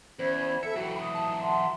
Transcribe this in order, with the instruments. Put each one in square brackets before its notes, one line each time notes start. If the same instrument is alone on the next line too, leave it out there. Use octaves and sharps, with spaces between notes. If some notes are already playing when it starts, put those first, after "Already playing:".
[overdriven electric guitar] E2 [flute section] C#4 B5 G#6 [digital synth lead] C5
[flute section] A4 [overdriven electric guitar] E5 [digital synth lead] C#7
[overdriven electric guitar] E3 F#3 [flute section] F#4 G5 B5
[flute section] D#6
[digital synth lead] A5
[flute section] E5 F#5 C6